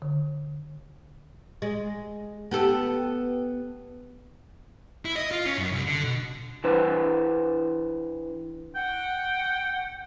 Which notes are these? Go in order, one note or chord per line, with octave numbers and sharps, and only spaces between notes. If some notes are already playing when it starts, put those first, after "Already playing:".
D3
G#3
B3 G4 A4
E4
D#5
F4
C#4
F#2
C2
D3
B2
E3 D4 B4 C5
F#5 G5